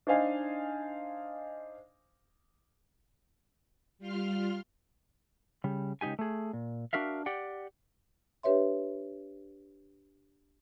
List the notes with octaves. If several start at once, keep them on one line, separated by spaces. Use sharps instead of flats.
D4 D#4 C5 D#5 F5 G#5
G3 F4 C6 F6
C#3 G3
C#2 F#3 D#4 G4 G#5
A3 G#4
A#2
D4 F#4 A#4 E5 F5
G4 D5 F#5 G5
D4 G4 B4 C#5 E5 C6